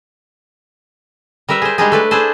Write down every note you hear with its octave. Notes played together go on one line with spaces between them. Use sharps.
G3 A#4 B4 E5
G#4 C5
G3 G#3 D4 D#4 G#4
A3 B4 D5
D4 E4 G#4 A4 C5